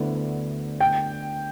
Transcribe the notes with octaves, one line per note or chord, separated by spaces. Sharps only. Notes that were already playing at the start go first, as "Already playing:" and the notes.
Already playing: D2 D3 B3 E4
G5